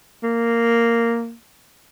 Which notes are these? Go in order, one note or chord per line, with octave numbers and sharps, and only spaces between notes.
A#3